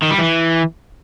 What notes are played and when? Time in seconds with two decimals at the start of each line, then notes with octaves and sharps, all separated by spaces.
0.02 D#3
0.10 G3
0.18 E3